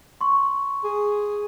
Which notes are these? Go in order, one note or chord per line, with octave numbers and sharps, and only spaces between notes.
C6 C#6
G#4